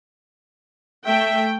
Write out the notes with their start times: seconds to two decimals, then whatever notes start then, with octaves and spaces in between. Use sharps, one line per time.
1.06 A3 E5 G5